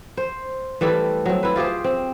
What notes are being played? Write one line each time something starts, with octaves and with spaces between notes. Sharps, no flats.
C5
E3 G3 A3 A4
F#3 C4
E4 B4
F4 G4 G#4 C5
C4